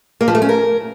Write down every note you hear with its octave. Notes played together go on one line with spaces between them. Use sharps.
A#3
F3
A3
C#4
A#4